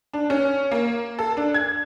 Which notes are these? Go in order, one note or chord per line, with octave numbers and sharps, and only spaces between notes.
D4
C#4
A#3
A4
D4
G#6